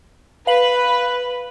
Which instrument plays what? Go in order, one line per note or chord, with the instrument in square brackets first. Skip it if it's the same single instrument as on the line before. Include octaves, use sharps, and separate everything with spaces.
[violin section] B4 [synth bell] F5 F#7